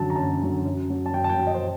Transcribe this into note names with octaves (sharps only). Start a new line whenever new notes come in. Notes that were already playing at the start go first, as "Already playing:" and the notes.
Already playing: F#2 D3 F#3 A5
A#5
F#2 A5
D3 F#3
F#2
F#3
A5
F#2 G5
A5
G5
F#3
D#5
C5